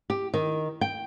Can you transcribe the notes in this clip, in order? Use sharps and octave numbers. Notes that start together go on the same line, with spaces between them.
G4
D#3
G5